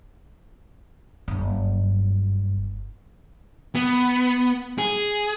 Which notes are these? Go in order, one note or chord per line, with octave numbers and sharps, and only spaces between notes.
F#1 G2
B3
G#4